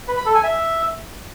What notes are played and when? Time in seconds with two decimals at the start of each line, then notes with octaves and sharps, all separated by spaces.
0.08 B4
0.17 B5
0.26 A4
0.35 G#5
0.44 E5